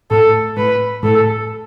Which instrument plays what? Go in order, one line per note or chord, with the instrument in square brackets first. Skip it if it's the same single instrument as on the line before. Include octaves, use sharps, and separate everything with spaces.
[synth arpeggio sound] A2 [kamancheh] A4
[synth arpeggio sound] A2 [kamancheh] B4
[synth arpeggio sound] A2 [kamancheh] A4